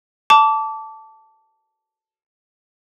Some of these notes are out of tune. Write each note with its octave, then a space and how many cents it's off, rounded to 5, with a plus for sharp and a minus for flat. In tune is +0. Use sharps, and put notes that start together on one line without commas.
A5 +0 D6 -25